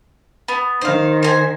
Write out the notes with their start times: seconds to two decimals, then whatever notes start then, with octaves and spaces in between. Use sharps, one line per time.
0.48 B3
0.81 D#3 C5 F5
1.23 C5 G#5